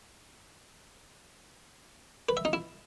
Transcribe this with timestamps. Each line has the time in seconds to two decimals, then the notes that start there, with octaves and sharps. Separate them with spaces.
2.29 B4
2.37 E5
2.45 D#4
2.53 E4